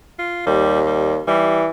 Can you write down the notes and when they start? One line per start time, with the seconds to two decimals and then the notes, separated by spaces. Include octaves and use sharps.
0.19 F4
0.46 D#2 G3
0.87 G3
1.27 E3 G3